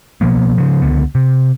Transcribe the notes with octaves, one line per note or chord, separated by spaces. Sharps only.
B2 F3 A#3 B3
C#3 F3
C#2 D3 B3
C3